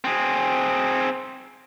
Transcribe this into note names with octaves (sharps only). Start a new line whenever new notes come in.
C4 G#4